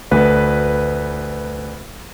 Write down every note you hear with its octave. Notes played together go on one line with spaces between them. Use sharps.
D2 B4